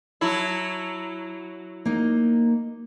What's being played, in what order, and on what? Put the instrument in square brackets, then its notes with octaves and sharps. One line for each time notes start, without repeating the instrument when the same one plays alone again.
[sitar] F#3 E4 [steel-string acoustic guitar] A5
[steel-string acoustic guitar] A#3 D#4